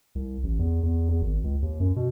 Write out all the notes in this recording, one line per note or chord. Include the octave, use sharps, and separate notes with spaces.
C2
A1
E2
E2
E2
G#1
C#2
D#2
F#2
B2